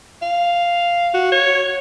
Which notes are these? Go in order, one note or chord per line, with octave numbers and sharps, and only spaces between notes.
F5
F#4
C#5